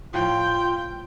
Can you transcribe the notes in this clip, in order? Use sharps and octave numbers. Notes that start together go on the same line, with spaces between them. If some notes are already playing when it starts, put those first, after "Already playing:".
A2 F3 F4 G5